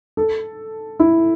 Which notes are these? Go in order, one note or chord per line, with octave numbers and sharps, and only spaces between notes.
A4
E4